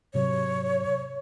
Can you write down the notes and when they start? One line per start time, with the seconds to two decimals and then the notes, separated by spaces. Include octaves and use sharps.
0.14 G#2 C3 F#3 C#5